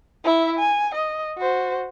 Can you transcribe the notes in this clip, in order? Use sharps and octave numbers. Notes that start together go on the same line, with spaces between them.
E4 E5
G#5
D#5
F#4 C5